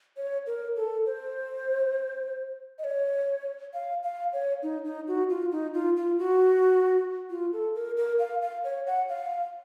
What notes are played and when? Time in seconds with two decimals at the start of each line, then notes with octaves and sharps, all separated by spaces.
0.17 C#5
0.47 A#4
0.77 A4
1.06 C5
2.79 D#5
2.84 C#5
3.74 F5
4.03 F5
4.33 C#5
4.63 D#4
4.85 D#4
5.08 F#4
5.30 F4
5.52 D#4
5.74 F4
5.97 F4
6.19 F#4
7.30 F4
7.53 A4
7.75 A#4
7.97 A#4
8.19 F5
8.42 F5
8.64 C#5
8.87 F#5
9.09 F5